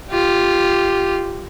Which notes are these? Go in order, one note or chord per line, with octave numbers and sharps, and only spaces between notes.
F4 G4